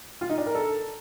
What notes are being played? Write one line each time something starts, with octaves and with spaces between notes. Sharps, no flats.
F4
D#4
D4
A#4
A4